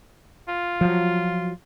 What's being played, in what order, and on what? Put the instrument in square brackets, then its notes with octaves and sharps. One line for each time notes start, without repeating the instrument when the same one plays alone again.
[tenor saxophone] F4
[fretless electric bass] F3 F#3